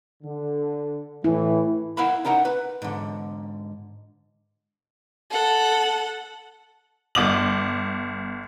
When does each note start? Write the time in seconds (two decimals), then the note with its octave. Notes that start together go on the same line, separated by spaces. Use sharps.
0.23 D3
1.24 A2 E3 E4
1.97 E4 A#4 F5 F#5 B5
2.25 C#4 D#4 A#4 F#5
2.45 B4
2.82 G#2 D3
5.30 A4 F#5
7.15 G1 D6 F#7